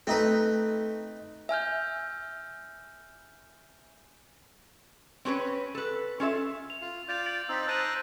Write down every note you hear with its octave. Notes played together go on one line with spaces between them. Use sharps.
A3 C4 D#4 B4
E5 G#5 F6 G6
C4 C#4 A#4 B4 C#5
A4 B4
C#4 F4 A4 E5
F7
F4
F4 D5 G6 A6 F7
A6 D7 F#7
C4 D#4 E6 B6
C5 A5 A#5 F#6 D#7 F#7